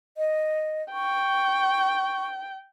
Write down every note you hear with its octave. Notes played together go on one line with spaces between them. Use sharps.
D#5
G5 C#6